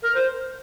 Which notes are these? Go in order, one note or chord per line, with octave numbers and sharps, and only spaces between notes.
A#4
C5